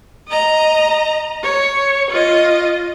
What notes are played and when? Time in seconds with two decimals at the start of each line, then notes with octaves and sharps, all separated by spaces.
0.28 D#5 A#5
1.42 C#5
2.10 F4 D#5